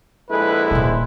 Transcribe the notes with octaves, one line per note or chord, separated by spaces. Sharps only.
A#1 G#3 E4 A4 B4
D#1 A#2 C5